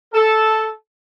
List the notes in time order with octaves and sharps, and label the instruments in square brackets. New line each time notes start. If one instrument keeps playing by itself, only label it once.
[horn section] A4